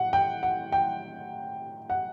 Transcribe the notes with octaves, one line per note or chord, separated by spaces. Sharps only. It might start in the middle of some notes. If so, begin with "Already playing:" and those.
Already playing: A2 F#5
G5
F#5
G5
F#5